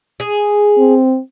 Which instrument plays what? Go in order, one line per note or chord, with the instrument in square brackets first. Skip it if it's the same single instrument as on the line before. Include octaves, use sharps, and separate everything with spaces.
[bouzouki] G#4
[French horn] C4